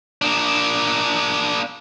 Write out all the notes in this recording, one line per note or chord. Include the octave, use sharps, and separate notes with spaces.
A#3 D4